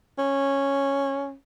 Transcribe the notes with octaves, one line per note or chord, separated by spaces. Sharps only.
C#4